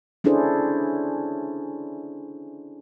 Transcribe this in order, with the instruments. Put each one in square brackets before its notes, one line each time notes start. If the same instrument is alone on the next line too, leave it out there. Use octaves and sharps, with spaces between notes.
[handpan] C#4 D4 E4 G#4 A4 C5